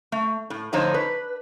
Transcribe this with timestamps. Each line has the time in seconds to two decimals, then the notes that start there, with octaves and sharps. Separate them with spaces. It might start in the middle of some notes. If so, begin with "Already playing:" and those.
0.12 A3
0.50 A2
0.73 A2 D3 F3 D#4 C5 C#5
0.94 B4